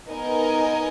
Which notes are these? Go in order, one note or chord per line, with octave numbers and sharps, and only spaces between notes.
B3 D#4 A#4 D#5 G#5